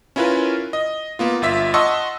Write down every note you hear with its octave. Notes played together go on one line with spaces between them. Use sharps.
C#4 E4 F4 A#4 B4 G#5
D#5
A#3 B3 F4
G1 F4 E5 B6
D#5 F#5 A5 C6 C#6 E6